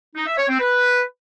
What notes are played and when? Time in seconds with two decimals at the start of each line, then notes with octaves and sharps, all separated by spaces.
0.15 D#4
0.26 E5
0.37 C#5
0.48 C4
0.59 B4